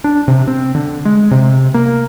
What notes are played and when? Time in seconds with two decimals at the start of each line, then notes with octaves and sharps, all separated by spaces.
0.04 D4
0.28 C3
0.47 C4
0.75 D3
1.05 G#3
1.31 C3
1.74 A#3